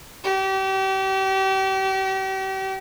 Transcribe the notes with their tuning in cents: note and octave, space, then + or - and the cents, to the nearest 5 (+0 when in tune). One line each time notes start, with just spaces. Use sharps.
G4 -35